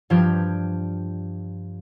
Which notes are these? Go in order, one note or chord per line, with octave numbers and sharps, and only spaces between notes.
G2 F3 D4 F4 G4 G#6